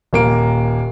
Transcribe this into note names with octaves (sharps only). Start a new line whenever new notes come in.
D#1 A#3 D7